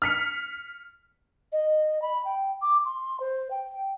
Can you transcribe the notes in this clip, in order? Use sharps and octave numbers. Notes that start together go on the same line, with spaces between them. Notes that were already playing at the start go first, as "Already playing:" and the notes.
F6 B6 C#7
D#5
B5
G5
D6
C6
C5
G5